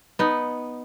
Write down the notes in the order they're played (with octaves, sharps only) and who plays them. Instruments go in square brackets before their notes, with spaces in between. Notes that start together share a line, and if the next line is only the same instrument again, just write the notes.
[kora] B3 D#4